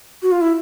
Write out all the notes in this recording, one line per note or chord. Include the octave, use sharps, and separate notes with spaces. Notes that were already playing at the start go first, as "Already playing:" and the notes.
F#4
F4
E4